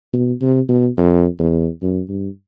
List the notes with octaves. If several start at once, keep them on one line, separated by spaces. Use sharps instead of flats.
B2
C3
B2
F2
E2
F#2
G2